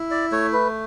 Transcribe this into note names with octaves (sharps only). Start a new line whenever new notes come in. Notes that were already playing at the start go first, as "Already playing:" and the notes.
Already playing: E4
D5
A3 C#5
B4